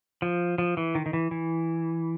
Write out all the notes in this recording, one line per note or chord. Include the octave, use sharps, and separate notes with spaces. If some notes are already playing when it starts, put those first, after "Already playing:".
F3
F3
E3
D#3
D#3
E3
E3